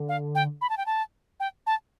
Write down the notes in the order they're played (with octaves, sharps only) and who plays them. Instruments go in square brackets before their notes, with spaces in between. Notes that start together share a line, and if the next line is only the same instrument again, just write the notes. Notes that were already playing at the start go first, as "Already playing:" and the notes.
Already playing: [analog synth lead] D3
[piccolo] F5
G5
B5
A5
G5
A5
G5
A5